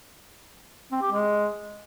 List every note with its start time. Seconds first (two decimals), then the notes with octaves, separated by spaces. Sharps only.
0.92 C4
1.02 G4
1.12 G#3